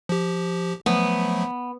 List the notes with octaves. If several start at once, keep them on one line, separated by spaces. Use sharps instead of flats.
F3 G4
F3 F#3 A3 B3